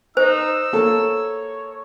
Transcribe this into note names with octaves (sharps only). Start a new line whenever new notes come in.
D#4 C5 E6
A#3 A4 C#5